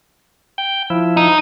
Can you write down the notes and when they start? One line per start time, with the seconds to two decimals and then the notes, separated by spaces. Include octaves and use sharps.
0.58 G5
0.90 F3 E4
1.17 D#4